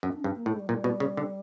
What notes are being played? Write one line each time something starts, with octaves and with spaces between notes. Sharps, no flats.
F#2
D4
G2 C#4
A#3
A2
G#3
G3
A#2 F#3
G3
B2
C#3
D3